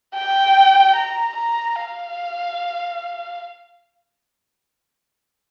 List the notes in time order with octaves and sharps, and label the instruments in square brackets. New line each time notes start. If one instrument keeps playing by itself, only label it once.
[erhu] G5
A#5
A#5
F5